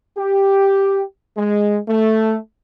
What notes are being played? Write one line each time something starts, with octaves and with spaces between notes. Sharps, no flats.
G4
G#3
A3